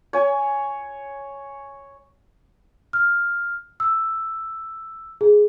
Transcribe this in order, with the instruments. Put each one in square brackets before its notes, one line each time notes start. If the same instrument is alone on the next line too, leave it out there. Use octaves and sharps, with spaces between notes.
[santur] C#5 G#5
[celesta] F6
E6
G#4